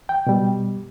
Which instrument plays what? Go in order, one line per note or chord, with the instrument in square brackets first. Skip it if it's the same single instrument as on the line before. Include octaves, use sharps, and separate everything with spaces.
[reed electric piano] G5
B2 G3